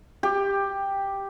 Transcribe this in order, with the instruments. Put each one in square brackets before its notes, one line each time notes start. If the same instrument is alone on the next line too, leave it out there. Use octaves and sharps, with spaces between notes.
[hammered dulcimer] G4